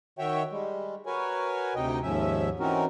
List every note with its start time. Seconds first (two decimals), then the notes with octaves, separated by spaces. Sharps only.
0.19 D#3 F#4 C#5 E5 G5
0.51 G3 G#3
1.06 F#4 A#4 B4 C#5 G#5
1.75 D2 C3 D#4 D#5 G5
2.03 D#2 G#2 F3 C#4 E5
2.60 E3 C4 C#4 D#4 F#4 A#4